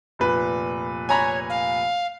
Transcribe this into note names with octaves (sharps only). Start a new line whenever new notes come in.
F1 A#2 B4
C#5 G#5 A#5 B5
F5